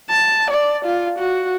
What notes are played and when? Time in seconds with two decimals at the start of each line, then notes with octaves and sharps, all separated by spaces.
0.11 A5
0.51 D5
0.85 F4
1.19 F#4